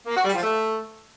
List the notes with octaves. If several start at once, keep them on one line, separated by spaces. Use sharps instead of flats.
A#3
F#4
G3
F3
A3